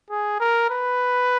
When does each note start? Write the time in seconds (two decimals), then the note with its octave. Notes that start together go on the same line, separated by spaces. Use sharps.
0.10 G#4
0.40 A#4
0.70 B4